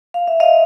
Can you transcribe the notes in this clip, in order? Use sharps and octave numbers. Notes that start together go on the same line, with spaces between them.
F5
E5
D#5 F5